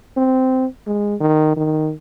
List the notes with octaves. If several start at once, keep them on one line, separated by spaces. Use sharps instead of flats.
C4
G#3
D#3
D#3